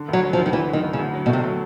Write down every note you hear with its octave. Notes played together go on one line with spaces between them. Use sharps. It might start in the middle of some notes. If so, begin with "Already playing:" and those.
Already playing: D3
D2 F#3
F#3
F3
D2
D#3
D2 E3
F#3
D#3
D2
C#3
D2
F#3
B2
C3 A3
F#3